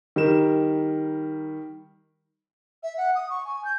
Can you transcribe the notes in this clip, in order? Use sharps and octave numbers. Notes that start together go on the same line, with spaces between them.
D#3 G3 A#4 E7
E5
F#5
D#6
C#6
G#5
G6